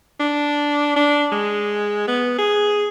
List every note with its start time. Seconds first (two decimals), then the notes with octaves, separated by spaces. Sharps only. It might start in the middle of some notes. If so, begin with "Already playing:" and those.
0.20 D4
0.96 D4
1.32 G#3
2.08 B3
2.38 G#4